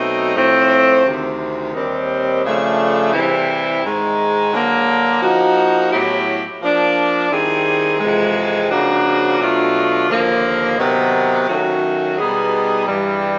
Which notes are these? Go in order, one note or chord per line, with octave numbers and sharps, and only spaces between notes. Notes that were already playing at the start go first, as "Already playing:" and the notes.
Already playing: B2 F#3 A3 C4 D#4
A2 F3 A3 C4
D2 C3 D#3
D#2 D#3 G3 C4
C#3 F3 A3 D4
C3 E3 G3 C4 E4
G#2 D#3 G#3
D3 F#3 A#3
F3 A#3 D#4 F#4
A2 F#3 B3 E4 G4
F3 A#3 D4
D#3 G3 C4 E4 G#4
F2 C3 E3 G#3
C#3 F3 A#3 D4 F#4
B2 F#3 A3 D4 F4
D#2 D3 F3 A#3
C3 D#3 F#3 B3
D#3 F#3 A3 C#4 F#4
B2 G3 B3 D#4 G#4
G2 E3 G3